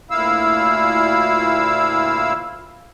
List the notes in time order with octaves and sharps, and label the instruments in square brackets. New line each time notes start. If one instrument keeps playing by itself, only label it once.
[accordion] D2 A#2 E4 F5 E6